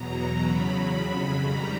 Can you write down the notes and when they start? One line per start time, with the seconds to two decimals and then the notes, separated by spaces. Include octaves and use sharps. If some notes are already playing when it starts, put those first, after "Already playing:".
Already playing: E2 B2 F#3 A#5
0.41 E2 C#3 F#3 B5
0.93 F2 C#3 F#3 B5
1.45 G#2 D#3 G3 A#5